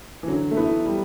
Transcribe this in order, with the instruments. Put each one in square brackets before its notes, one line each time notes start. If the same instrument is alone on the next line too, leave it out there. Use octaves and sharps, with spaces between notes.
[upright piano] E3
[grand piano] D3 [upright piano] F#3
[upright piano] A3
[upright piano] B3 [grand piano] E4
[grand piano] G3